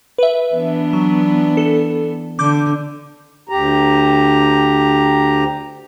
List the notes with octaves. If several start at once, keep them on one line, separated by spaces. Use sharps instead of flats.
B4 E5
E3 B3 D4
F#3
A4
D3 D6 G6
D2 G4 A#5